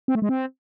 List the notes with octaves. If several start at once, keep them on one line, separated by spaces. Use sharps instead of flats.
C4
A3
G#3
C4